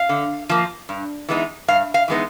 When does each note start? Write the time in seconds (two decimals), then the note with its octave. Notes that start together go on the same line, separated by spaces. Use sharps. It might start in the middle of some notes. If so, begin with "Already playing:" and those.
Already playing: F5
0.09 D3
0.49 F3 A#3
0.89 G2
1.29 E3 G#3 B3 D#4
1.68 G2 F5
1.94 F5
2.08 E3 G#3 B3 D#4